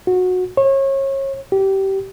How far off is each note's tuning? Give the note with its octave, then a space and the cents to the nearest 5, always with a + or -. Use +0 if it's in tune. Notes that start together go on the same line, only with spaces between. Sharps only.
F#4 -20
C#5 -30
G4 -20